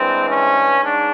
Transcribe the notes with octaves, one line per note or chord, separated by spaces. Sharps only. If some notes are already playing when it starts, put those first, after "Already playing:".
Already playing: G2 E3 G#3 C4
C#4
G#2 D4